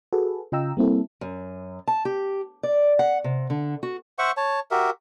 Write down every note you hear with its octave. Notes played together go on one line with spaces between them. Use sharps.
F#4 G#4 A4 B4
C#3 F4 D#5 G5 A#5 E6
G3 A#3 C4 E4 A4
F#2
A5
G4
D5
F#5
C3
D3
F#4
C5 E5 F#5 C#6
C#5 A5
F#4 G4 A#4 E5